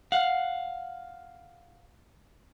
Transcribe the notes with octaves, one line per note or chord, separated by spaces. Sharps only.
F5 F#5